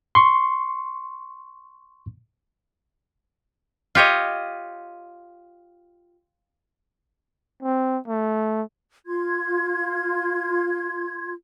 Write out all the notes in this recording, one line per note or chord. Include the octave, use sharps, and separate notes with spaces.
C6 C#6
F4 G4 C#5 D#5
C4
A3
F4 C6 G#6